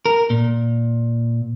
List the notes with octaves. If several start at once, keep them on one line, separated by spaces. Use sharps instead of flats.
A#4
A#2